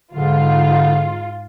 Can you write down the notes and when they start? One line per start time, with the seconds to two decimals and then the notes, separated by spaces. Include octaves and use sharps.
0.14 G#2 D3 F4